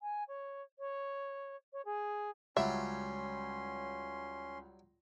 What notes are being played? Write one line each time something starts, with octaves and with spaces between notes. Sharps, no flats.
G#5
C#5
C#5
C#5
G#4
C#2 F#3 G3 C#4 E5 C6